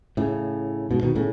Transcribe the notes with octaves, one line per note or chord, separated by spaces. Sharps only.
A2 C#3
G#2 B2
B2 D#3
A2 C#3